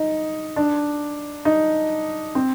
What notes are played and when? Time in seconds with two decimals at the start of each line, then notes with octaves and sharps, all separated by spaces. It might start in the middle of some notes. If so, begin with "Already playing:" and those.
Already playing: D#4
0.56 D4
1.45 D#4
2.35 C4